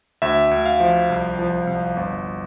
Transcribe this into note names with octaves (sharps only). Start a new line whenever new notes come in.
D2 E5
D2
F5
F3
C2
F3
C2
G1